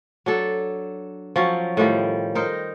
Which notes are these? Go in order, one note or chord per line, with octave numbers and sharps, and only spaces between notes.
F#3 D4 A4
F3 F#3 C#4
A2 D#3 F3 G3
D#4 A#4 C5